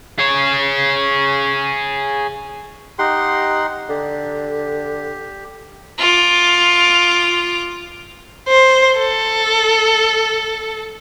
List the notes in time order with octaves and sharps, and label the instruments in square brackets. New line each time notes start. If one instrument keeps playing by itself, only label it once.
[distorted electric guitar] G#4 C#5
[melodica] D#4 F#5 C6 [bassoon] G4
[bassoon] D3 [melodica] G4
[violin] F4 D6
C5
A4